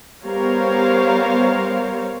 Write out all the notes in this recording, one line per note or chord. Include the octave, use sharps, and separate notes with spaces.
G3 B3 A#4 C5 C#5 F5